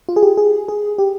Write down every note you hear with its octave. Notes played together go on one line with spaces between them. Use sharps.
F4
G#4
G4
G#4
G#4
G4